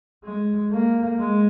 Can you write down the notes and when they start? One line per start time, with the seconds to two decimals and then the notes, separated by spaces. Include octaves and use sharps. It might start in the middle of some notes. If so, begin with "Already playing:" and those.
0.24 G#3
0.71 A#3
1.19 G#3